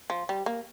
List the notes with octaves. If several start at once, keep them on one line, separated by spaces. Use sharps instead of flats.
F3
G3
A#3